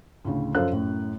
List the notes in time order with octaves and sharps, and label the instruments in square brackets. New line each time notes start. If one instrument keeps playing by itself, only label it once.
[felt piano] D2 A2 C#3
F#2 F3 A4 C5 F5 F#6
F#2 A2